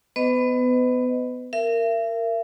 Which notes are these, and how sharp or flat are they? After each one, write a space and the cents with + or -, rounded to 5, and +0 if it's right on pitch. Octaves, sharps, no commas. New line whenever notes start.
B3 +15 B4 +35 D#5 +0
A#4 -15 E5 +40